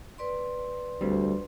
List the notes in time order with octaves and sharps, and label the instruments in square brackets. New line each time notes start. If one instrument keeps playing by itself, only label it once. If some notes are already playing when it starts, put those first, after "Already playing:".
[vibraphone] B4 D5 C6
[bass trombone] D2 [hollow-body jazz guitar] G3 C4